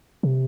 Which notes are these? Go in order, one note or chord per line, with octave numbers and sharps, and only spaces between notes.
C3